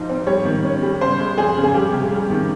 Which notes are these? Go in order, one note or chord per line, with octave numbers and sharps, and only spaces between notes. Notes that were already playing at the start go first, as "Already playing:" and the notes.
Already playing: G#2 F3 D#4
C4
G3 C#5
D#3
C#4
G3
C#3 C5
G#3
F2 G#4
C#3
G#4
G3 G4
C3
G3
D#3